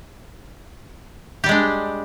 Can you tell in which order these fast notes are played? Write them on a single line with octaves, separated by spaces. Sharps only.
G4 G3 G#3 D4